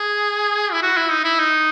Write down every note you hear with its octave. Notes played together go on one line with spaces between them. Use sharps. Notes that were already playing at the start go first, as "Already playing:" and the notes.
Already playing: G#4
E4
F#4
E4
D#4
E4
D#4